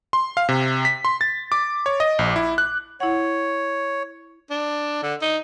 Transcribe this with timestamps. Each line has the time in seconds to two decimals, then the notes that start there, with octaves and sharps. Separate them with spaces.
0.13 C6
0.37 F5
0.49 C3
0.85 B6
1.05 C6
1.21 A6
1.52 D6
1.86 C#5
2.00 D#5
2.19 A#1
2.36 E4
2.58 F#6
3.00 E4 C#5 F#5
4.51 D4
5.03 D3
5.22 D#4